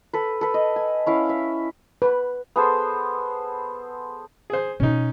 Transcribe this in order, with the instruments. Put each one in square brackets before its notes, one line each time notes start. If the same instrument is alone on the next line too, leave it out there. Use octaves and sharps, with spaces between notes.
[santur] A4 B4
A4 B4
D#5
G#5
C#4 E4 F5
E5
[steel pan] B4
[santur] B3 G#4 A4 C5
[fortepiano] G#4 C5
[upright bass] B2 B3 [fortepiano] C#4 D#4